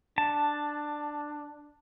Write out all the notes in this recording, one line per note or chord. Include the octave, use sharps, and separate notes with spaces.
D4 A5